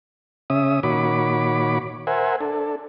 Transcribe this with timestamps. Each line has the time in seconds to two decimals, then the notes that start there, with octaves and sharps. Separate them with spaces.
0.50 C#3 C#4 E5 D#6
0.83 A#2 D#3 F#4 C#5 B5 D6
2.07 A#4 C5 E5 F#5 G#5
2.41 D4 A4